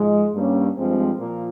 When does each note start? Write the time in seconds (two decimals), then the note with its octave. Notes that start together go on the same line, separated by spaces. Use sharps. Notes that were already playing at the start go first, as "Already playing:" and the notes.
Already playing: G#2 F3 G#3
0.35 G2 G3 A#3 C#4
0.77 G2 F3 G#3 C4
1.19 A#2 F3 A#3